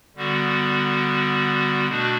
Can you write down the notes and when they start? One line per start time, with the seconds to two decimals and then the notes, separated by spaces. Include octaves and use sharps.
0.16 D3 G3 B3 F#4
1.88 B2 A3 D4 F#4